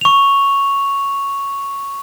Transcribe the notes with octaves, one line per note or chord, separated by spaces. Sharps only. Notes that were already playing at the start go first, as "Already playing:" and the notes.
C#6 F7